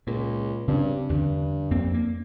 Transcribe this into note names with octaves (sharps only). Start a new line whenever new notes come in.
C#2 A#2
G2 C#3 C4 C#4
E2 G2 D3
F2 A#3 C4
A#3